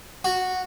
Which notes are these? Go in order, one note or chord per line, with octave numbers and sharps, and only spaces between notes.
F#4